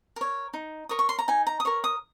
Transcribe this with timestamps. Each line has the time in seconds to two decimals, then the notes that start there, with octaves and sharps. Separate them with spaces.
0.16 A#4 C#5
0.53 D#4
0.89 A#4 C#5 D#6
0.99 C#6
1.09 C6
1.18 A#5
1.28 D#4 G#5
1.47 A#5
1.60 D#6
1.65 A#4 C#5 C#6
1.84 D#6